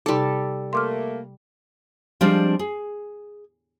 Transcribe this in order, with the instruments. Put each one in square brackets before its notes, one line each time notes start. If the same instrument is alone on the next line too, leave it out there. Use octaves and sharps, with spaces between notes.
[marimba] C3 D#4 [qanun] G3 A4
[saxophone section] A3 A#3 [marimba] C6 D6 F6
[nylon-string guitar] F3 G3 G#3 C4 D4
G#4